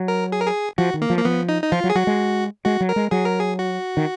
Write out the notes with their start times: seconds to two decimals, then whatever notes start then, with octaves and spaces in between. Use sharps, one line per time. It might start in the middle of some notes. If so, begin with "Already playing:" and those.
Already playing: F#3
0.08 A#4
0.32 G#4
0.40 A#4
0.47 G#4
0.78 F3 F#4
0.94 D#3
1.02 A#3
1.10 F3
1.18 A#3
1.25 F3 B3
1.49 D#4
1.63 D#4
1.72 F3 F4
1.84 F#3
1.90 G#4
1.95 F#3 F#4
2.07 G#3
2.65 G#3 F#4
2.81 F#3
2.89 A#4
2.96 G#3
3.11 F#3 G#4
3.25 A#4
3.39 G#4
3.59 F#4
3.97 D#3